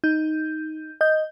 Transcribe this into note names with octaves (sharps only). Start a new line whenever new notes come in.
D#4 G6
D#5 G6